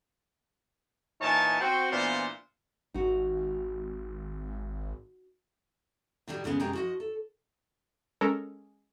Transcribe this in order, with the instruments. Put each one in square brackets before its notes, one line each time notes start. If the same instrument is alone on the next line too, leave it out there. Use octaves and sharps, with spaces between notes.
[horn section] A#2 E3 D#4 C#5 G#5 A5
C4 F#4
A#2 E3 B3 D4 F4 C5
[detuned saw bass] G#1 [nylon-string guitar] D#4 F#4
[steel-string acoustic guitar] A2 D#3 F#3 G3
D2 C#3 G#3 B3
F#2 C3 G#3 G4 D#5 A#5
F3 F#4 D#5
A4
[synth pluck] G#3 C#4 A4 A#4